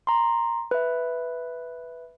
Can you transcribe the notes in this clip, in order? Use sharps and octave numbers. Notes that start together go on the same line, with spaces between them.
A#5 C6
B4 E5